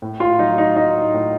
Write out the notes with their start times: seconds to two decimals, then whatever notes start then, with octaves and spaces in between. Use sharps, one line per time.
0.02 A2
0.20 F4
0.39 F#3 D#4
0.58 D#4
0.76 A2 D#4
1.14 A2